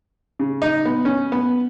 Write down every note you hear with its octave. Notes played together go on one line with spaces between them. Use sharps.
C#3
D#4
B3
C#4
B3